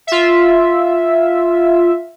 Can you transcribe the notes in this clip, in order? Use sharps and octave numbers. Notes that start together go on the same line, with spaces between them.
F4 E5